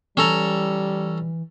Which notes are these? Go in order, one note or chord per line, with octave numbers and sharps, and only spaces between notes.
E3 G3 C#4 A4 A#5